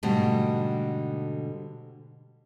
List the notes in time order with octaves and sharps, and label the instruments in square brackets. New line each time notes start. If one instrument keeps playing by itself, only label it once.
[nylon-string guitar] G#2 B2 D3 G3 A3